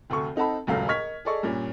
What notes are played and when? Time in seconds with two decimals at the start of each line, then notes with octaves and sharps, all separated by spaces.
0.10 F1 D2 A4 C#6
0.36 C4 D#4 A4 F#5 A5 B5
0.67 D#1 C#2 F#2 A3 F5
0.88 A#4 D#5 C#6 F6 G#6 B6
1.25 G#4 A4 D5 D#5 C#6
1.43 G2 A#2 C#4